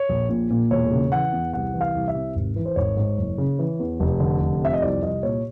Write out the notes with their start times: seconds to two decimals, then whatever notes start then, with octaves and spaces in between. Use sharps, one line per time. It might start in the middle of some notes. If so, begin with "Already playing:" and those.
Already playing: C#5
0.09 A#1
0.29 A#2
0.50 A#2
0.71 E1 C#5
0.91 C#3
1.12 E3 F#5
1.32 E2
1.53 C2 F#5
1.74 E3
1.81 F5
1.94 C2
2.08 E5
2.15 C3
2.36 G#1
2.56 E3
2.66 C5
2.76 G#1 C#5
2.97 G#2
3.18 F#1
3.38 C#3
3.59 E3
3.79 E2
4.00 F1
4.20 D3
4.41 F1
4.62 F2 E5
4.73 D#5
4.82 C2 D5
5.03 C2 D#5
5.23 A#2 C#5